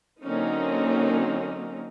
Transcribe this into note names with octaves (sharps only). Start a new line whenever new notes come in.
D3 F#3 A#3 C4 C#4 D#4